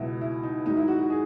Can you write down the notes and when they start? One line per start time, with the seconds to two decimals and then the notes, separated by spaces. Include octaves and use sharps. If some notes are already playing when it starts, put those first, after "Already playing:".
Already playing: C#2 B2 F#3 E4
0.21 E4
0.43 D#4
0.66 G#2 D#3 F#3 D#4
0.77 E4
0.88 F#4
0.99 F#4
1.10 G#4